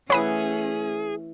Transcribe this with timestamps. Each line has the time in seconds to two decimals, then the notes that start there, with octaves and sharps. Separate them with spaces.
0.10 E3 A3 C#4 G#4 C#5 F#5 B5 D#6